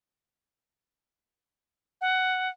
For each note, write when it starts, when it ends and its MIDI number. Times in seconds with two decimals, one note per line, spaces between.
2.01 2.49 78